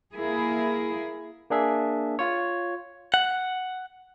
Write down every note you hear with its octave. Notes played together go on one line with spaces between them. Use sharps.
A#3 E4 G#4
A#3 D4 G#4 E5
F4 C#5
F#5